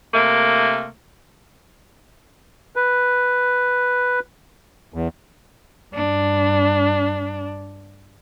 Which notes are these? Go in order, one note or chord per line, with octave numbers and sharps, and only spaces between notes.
C3 A3 A#3
B4
E2
G2 D4